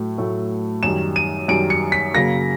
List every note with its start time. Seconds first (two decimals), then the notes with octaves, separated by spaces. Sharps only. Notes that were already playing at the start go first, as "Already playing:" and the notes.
Already playing: A2 F#3 A3
0.18 A2 F#3 A3
0.83 F#2 D#3 G3 E7
1.16 D#7
1.48 F#2 D#3 G3 D7
1.70 C#7
1.92 B6
2.14 F#2 C#3 F#3 A#3 A#6